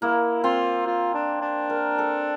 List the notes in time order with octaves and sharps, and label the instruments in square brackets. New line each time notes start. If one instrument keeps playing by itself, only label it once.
[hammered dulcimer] A#3 [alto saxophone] E4
[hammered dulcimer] C4 [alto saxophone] F4
[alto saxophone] F4
D4
D4
[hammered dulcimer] A#4
A4